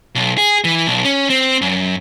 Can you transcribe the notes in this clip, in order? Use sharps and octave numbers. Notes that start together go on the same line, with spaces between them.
B1
G#4
E3
B1
C#4
C4
F#2